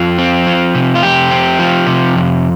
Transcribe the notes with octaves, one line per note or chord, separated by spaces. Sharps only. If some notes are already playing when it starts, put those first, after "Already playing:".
Already playing: F2 F4
C4
F3
C3
F4
F2 G4
C4
F3
C3
F2